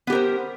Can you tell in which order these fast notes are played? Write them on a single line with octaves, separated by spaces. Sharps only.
B3 G4 A#4 C5